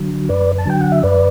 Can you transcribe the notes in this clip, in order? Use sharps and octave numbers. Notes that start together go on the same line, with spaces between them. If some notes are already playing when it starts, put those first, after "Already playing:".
Already playing: D3 F#3
F#2 B4 D5
A5
D3 F#3 G5
F#5
E5
F#2 B4 D5